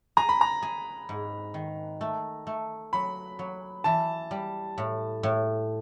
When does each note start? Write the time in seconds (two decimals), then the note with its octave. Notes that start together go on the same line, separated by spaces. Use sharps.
0.17 G#4 A#5
0.29 B5
0.41 A#5
0.62 G#4
1.09 G#2
1.54 D#3
2.01 A3
2.47 A3
2.93 F#3 B5
3.39 F#3
3.84 E3 A5
4.31 G3
4.78 A2
5.23 A2